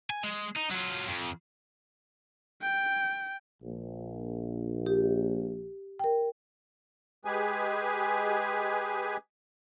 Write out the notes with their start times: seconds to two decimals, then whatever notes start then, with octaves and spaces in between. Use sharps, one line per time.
0.10 G#5
0.24 G#3
0.56 D#4
0.71 F#3 F4
1.08 F2
2.61 G5
3.63 A#1
4.86 G4
5.99 A#4 G5
7.25 G#3 G4 G#4 B4 G#5